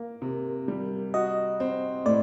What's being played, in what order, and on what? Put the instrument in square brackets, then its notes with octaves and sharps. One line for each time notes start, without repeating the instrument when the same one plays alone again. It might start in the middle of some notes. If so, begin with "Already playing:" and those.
Already playing: [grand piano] A#3 [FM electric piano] A#4
[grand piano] C3
G3
[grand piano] F#4 [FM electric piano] D#5
[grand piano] C4
[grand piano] A2 [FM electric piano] D5